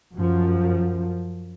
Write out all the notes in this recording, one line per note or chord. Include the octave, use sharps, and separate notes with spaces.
F#2 F3